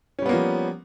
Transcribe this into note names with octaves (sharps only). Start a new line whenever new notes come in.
F3 G3 A#3 B3 C#4